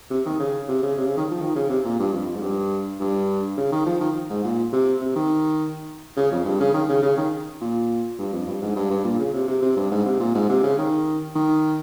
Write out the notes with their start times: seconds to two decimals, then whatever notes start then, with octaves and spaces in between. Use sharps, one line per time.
0.11 C3
0.26 D#3
0.40 C#3
0.68 C3
0.83 C#3
0.98 C3
1.07 C#3
1.17 D#3
1.31 F3
1.41 D#3
1.55 C#3
1.70 C3
1.85 A#2
1.99 G2
2.13 F2
2.36 G#2
2.42 G2
3.00 G2
3.57 C#3
3.72 D#3
3.86 F3
4.01 D#3
4.30 G#2
4.44 A#2
4.73 C3
5.01 C3
5.16 D#3
6.17 C#3
6.31 F2
6.45 G2
6.60 C#3
6.74 D#3
6.89 C#3
7.02 C#3
7.17 D#3
7.61 A#2
8.19 G2
8.33 F2
8.47 G2
8.62 G#2
8.76 G2
8.90 G2
9.04 A#2
9.19 C#3
9.34 C3
9.48 C3
9.62 C3
9.77 G2
9.91 G#2
10.06 C3
10.20 A#2
10.34 G#2
10.49 C3
10.64 C#3
10.78 D#3
11.35 D#3